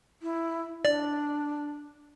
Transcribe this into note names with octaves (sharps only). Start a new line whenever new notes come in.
E4
D4 D5